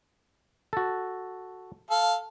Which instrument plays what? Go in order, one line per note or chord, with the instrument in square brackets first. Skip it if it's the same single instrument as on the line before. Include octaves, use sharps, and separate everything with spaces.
[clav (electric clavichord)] F#4 A4
[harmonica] A4 F5